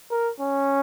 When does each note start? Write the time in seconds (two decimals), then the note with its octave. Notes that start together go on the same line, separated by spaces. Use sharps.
0.11 A#4
0.40 C#4